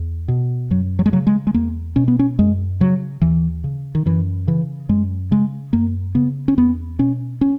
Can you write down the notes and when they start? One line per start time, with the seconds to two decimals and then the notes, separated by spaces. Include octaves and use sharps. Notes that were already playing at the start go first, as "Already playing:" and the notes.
Already playing: E2
0.28 B2
0.70 F#2 F#3
0.99 F#3
1.06 G#3
1.12 C#3 F#3
1.27 G#3
1.47 G#3
1.54 E2 A#3
1.96 B2 C#4
2.08 B3
2.19 C#4
2.39 F#2 G#3
2.80 C#3 F#3
3.22 D#2 E3
3.64 C#3
3.95 D#3
4.06 F#2 E3
4.47 C#3 E3
4.89 F#2 G#3
5.31 C#3 G#3
5.73 F#2 A#3
6.15 C#3 B3
6.48 C#4
6.57 E2 B3
6.99 B2 C#4
7.41 C#4